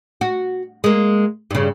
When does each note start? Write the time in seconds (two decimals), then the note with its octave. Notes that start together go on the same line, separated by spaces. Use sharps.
0.21 F#4
0.84 G#3 A#3
1.51 G2 C#3